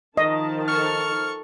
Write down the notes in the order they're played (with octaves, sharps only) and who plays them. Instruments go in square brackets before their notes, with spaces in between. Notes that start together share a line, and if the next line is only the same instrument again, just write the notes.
[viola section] D#3 F3 A5 [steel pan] D#5
[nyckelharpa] A4 C#6 [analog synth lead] F6